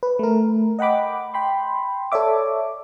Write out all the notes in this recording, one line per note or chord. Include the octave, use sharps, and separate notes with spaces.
B4
A3 A#4
D#5 F#5 G5 B5 D6
G5 B5 C6
A4 C#5 D5 E5 D6